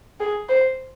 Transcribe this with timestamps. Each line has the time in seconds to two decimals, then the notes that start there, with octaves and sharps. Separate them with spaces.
0.20 G#4
0.49 C5